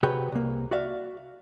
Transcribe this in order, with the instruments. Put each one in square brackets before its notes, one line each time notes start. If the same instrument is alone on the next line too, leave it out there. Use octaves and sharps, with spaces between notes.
[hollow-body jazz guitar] C3 F#4 G#4 B4 C#5 G5
C2 A#3
F#4 D5 E5 F5